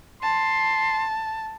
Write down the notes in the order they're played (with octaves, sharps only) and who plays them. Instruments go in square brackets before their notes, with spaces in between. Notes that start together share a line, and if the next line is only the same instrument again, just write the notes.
[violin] A5 [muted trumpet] C6